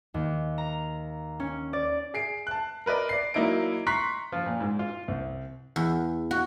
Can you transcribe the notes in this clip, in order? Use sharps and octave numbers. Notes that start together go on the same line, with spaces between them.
D#2
A#5
C#4
D5
G#4 C7 D7
A5 F#6
A#4 B4 D5 D#5
D5 C7
F#3 A#3 D#4 E4 D5 D7
A#5 C6 C#6 F#6 B6 C7
F3
A#2
G#2
F4
C2
E2
F#4